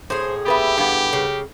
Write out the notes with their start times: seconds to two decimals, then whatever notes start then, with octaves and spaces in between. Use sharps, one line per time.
0.10 A2 G#4 C5
0.46 B3 G4 B4 E5
0.78 G2 B3
1.13 C#3